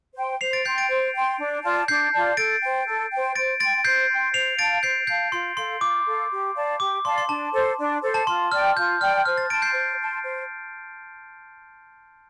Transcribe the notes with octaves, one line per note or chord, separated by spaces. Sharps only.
C5 G5 C6
C5 C7 F7
A6 D7
G5 C6 G6 C7
A6 D7
C5
G5 C6
D4
F4 D5 A5
D4 G6 C7
F4 D5 A5
A4 A6 D7
C5 G5
A4
C5 G5
C5 A6 D7
G5 C6 A6 D7
C5 G6 C7
G5 C6
C5 C7 F7
F5 A5 A6 D7
C5 G6 C7
F5 A5 G6 C7
F4 C6
A4 F5 C6
F4 D6
A4 F5
G4
D5 F5 A5
G4 D6
D5 F5 A5 C6
C6
D4 A5
A4 C5
D4
A4 C5
A5
F4 C6
D5 G5 F6
F4 G6
D5 G5 F6
C5 F6
F6 A6
A5 C6 A6 D7
G6 C7
C5
A5 C6
C5